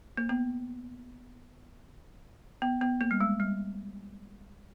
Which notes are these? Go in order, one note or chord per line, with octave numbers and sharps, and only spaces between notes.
A#3
B3
B3
B3
A#3
G3
G#3
G3